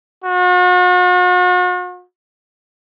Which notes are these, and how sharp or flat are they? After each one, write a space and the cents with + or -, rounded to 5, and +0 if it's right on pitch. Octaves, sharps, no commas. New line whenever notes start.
F#4 -45